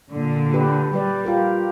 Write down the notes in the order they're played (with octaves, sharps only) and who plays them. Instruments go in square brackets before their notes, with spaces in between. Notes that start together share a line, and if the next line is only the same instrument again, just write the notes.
[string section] A#2 D3
[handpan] G4 B4
[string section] G3 [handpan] G4 B4 D5
[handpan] F4 G4 A#4